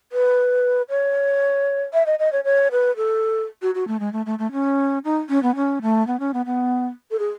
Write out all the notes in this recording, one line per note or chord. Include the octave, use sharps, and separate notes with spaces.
B4
C#5
E5
D#5
D#5
C#5
C#5
B4
A4
F#4
F#4
A3
G#3
A3
A3
A3
C#4
D#4
C#4
B3
C#4
A3
B3
C#4
B3
B3
A4
G#4